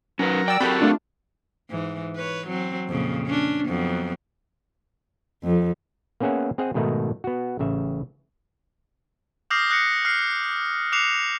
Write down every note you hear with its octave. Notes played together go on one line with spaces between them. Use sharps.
F#3 C#4 D#4 A#4 B4
D5 G5 E6
C4 F#4 G4 A4 A#4 G5 B5
A3 D4 F4
G#2 E3
B4 C#5
F#3 C4
F2 A#2 C#3
C#4 D4
F2 F#3 B3
F2
A#3 B3 C#4 G#4 E5 F#5
C4 G#4 D#5 F#5
G#2 B2 D#3 A3 D#4
B3 F#4
A1 C#3 E5
D6 D#6 F6 G6 A#6 C7
D#6 F#6 A#6 C#7
F6 F#6 C7
D6 F#6 C7 C#7 E7 F7